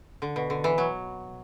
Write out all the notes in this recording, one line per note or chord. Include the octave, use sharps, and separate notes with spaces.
D3
B2
D3
E3
F#3